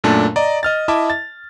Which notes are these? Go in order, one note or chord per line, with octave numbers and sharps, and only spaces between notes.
F#2 A#2 A3 D4 A5
D5 D#5 A#5
D#5 F6 A6
E4 D#5 E5 A5 D6
A6